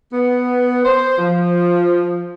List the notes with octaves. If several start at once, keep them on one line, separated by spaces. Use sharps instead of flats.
B3
C5
F3